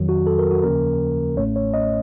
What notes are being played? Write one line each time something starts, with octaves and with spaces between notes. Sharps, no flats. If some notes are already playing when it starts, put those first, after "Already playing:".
Already playing: F2 D#3 F#3
F#4
A4
A#4
F#4
D#2 C#3 F3 A#3 C#4 A#4
A1 A2 A3 C#4 C#5
C#5
D#5